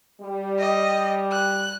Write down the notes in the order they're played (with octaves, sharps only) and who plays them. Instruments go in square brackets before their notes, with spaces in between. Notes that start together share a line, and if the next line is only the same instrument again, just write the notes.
[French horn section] G3
[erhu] D#5
F#6